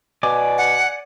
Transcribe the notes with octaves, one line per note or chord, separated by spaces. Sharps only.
B2 D5 G#5 D6
F#5